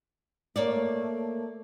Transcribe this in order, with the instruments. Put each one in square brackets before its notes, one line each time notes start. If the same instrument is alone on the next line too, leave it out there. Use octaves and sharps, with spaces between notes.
[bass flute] A3 [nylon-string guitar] A#3 C#5 D5